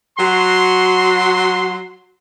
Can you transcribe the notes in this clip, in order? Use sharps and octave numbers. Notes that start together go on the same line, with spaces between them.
F#3 F#4 C6